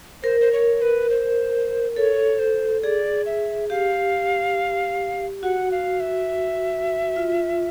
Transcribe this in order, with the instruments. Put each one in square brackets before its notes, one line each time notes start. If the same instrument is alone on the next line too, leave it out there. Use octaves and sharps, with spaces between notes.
[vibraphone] A#4 [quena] C5
[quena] C5
C#5
B4
C5
[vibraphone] A4 [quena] C#5
[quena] C5
[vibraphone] G#4 [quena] D5
[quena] E5
[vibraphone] G4 [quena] F5
[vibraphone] F#4 [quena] F#5
[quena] F5
E5
[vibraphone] F4